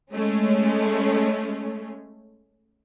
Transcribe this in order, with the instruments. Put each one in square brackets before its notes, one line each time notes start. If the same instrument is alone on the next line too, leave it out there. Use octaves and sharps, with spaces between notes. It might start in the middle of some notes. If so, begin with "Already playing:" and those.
[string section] G#3 A3 C#4